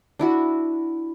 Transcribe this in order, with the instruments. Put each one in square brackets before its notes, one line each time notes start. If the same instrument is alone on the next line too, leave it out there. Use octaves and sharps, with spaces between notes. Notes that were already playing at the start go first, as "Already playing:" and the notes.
[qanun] D4 E4 F#4